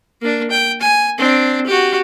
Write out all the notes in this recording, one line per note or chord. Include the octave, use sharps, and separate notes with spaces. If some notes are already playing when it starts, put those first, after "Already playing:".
A#3 D4
G5
G#5
C4 D4
F#4 G4